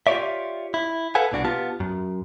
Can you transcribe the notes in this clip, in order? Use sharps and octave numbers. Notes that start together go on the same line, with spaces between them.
F4 G4 G#4 C#5 D5 E5
E4
A4 B4 F5 F#5 G#5
C2 B2 D4 F#4
B3 F4 G4 A5
F#2